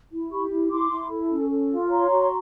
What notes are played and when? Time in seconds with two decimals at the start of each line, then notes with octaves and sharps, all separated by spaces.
0.11 E4
0.30 G4 B5 C#6
0.51 E4
0.70 E4 C6 D6
0.91 E4
1.10 A4
1.30 C#4
1.50 A4
1.70 F4
1.90 C#5 A#5 C6
2.10 F#4